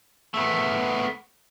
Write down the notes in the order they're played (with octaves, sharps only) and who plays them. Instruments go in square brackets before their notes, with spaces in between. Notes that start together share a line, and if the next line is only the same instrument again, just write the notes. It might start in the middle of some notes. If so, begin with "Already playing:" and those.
[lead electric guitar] A3 B3